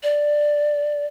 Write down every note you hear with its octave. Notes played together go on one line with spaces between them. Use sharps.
D5